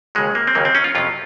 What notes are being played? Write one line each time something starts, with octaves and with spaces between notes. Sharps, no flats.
D#2 C#3 F#3 G#3
A#3
C4
D#2 C#3 F#3 A#3
C4
C#4
F4
F2 C3 F#3 F4